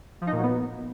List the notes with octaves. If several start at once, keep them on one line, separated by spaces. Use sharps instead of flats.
F3
D#4
A#2
F#3
B3